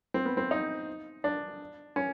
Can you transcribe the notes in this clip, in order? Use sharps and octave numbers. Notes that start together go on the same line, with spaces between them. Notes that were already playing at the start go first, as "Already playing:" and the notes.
C4
B3
C4
D#4
D4
C#4